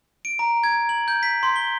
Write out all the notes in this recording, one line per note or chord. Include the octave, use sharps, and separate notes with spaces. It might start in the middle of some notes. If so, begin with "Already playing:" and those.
D7
A#5
G#6
F#7
G6
B6
C6
G7